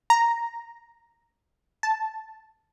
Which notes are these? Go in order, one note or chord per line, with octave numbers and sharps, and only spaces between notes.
A#5
A5